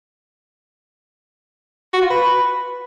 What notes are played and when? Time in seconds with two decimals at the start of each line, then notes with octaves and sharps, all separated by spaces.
1.93 F#4
2.02 F4
2.10 B4